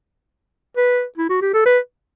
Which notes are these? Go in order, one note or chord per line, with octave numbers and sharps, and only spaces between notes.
B4
E4
F#4
G4
A4
B4